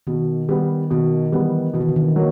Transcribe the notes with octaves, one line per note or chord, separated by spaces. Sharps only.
B2 D#3
D#3 G3 B3
B2 D#3
E3 G3 B3
B2 E3
D#3
D3
D#3
F#3 A#3